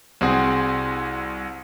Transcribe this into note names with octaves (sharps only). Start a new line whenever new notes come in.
C2 C4 F#4 G#4